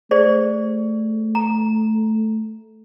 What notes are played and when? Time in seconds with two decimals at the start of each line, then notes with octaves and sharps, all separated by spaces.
0.11 A3 G#4 C5 D5
1.35 A#5